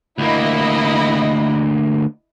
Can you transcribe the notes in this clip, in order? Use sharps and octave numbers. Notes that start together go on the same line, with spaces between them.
D2 A#3 E4 D#5